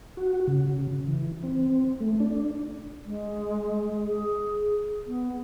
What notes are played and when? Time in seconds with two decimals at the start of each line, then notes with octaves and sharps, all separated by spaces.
0.17 F#4
0.47 C#3
1.08 E3
1.43 C4
2.00 A3
2.20 D4
3.05 G#3
4.06 G#4
5.07 B3